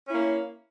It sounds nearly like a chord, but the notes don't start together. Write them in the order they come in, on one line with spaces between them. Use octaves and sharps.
C#4 E4 A#3